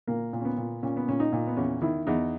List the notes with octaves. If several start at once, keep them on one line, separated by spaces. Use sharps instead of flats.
A#2 A#3
A#2
C#4
B3
A#2
A#2 C#4
B3
A#2 C#4
D#4
A#2
B3
E2 C#4
D#3 E4
E2 D#4